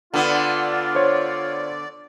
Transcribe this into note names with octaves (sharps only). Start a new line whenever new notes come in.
D3 B3 F4 D5
C5 C#5